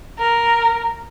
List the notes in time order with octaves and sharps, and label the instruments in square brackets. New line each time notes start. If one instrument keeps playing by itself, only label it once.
[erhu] A#4